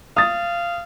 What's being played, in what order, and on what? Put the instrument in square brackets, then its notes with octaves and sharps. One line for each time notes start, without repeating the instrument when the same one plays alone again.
[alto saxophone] F5 [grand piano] D#6 A6